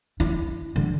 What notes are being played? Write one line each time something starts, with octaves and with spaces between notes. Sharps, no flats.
E4
D3